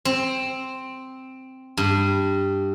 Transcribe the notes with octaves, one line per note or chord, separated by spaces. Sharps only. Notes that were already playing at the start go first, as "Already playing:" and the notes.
C4
G2